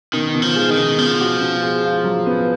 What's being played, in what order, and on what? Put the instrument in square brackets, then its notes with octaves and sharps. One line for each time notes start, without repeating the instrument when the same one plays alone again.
[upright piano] B2 [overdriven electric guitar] D#3
[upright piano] B2
[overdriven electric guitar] F3
[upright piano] G#3
[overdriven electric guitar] D#3
[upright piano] B2
[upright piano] B2 [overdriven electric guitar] F3
[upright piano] F#4
B2
G#3
F4
F#3
B3